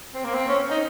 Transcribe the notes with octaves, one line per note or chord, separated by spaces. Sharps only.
C4
A#3
C4
C#4
C#4
D#4